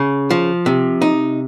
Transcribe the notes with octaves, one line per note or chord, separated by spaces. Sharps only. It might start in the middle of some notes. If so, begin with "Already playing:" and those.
Already playing: C#3
F3
C3
D#4